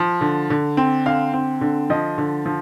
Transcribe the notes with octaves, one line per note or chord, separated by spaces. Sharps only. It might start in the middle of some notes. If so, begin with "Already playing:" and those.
Already playing: F3
D3
D3
C4
D3 F5
C4
D3
F3 D#5
D3
F3